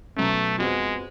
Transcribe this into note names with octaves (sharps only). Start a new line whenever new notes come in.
B2 F#3 A3 C#4
F2 F3 G#3 B3 F#4